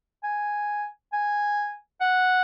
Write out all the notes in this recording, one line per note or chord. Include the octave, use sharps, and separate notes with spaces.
G#5
G#5
F#5